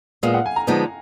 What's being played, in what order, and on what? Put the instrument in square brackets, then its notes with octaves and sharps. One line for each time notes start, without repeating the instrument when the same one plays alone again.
[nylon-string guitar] A#2 G#3 B3 [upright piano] F5
[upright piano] F#5
G#5
A#5
[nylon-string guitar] D3 F3 G#3 B3 D#4